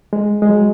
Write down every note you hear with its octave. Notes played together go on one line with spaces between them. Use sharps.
G#3
G#3
F#3